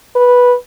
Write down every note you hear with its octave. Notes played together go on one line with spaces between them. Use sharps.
B4